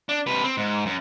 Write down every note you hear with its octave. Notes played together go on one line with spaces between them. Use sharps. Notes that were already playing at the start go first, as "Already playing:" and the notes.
D4
C3 B4
C4
G#2
F#2